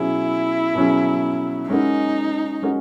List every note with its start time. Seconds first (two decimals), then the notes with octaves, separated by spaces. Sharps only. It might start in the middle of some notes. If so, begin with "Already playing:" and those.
Already playing: B2 F#3 C#4 E4 G#4
0.75 B2 F#3 C#4 G#4
1.69 G#3 C#4 D#4 F#4 A#4
2.62 G#3 C#4 F#4 A#4